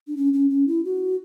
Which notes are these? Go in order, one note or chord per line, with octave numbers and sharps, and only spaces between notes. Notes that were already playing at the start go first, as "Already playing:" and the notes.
D4
C#4
C#4
C#4
E4
F#4